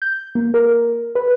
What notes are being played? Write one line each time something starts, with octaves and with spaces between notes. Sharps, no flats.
G6
A#3
A#4
B4